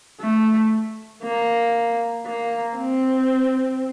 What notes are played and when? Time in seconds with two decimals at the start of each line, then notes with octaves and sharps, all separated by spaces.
0.20 A3
1.23 A#3
2.25 A#3
2.77 C4